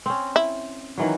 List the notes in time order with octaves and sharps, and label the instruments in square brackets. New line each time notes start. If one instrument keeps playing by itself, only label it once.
[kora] C4 C#4
[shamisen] E4
[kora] D#3 E3 F#3